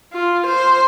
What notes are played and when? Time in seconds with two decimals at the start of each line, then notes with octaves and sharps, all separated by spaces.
0.13 F4
0.46 C5